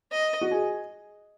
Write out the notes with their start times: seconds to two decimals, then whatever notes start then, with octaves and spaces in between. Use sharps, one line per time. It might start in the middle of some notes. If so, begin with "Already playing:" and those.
0.11 D#5
0.41 F#4
0.51 G#4